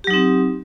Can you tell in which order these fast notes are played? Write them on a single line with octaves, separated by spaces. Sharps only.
G4 F#3 D#4 C4